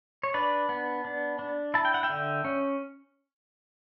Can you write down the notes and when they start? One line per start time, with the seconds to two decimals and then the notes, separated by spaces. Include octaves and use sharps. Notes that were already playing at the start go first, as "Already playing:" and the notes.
0.23 C#5
0.34 D4 B4 D5
0.69 B3
1.05 D4
1.39 D4
1.74 E4 A5
1.85 G5
1.94 F#5
2.03 E5 G5
2.10 D3
2.45 C#4